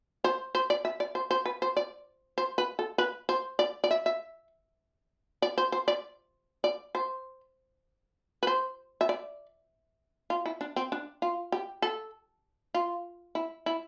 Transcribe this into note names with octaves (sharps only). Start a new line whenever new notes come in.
C5
C5
D5
E5
D5
C5
C5
B4
C5
D5
C5
B4
A4
B4
C5
D5
D5
E5
E5
D5
C5
C5
D5
D5
C5
B4
C5
E5
D5
F4
E4
D4
C4
D4
F4
G4
A4
F4
E4
E4